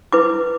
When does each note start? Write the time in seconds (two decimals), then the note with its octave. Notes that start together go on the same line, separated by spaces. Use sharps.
0.13 E4 B4 D6